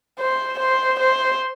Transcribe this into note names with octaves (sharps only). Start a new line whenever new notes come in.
C5
C5
C5